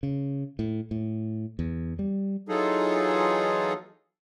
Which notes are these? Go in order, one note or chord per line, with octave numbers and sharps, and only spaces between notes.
C#3
A2
A2
E2
G3
E3 F#3 D#4 F4 G#4 A4